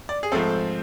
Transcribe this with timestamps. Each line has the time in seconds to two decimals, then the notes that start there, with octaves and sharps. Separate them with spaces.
0.09 D5
0.23 G#4
0.32 G#2 F3 A3 C4 A4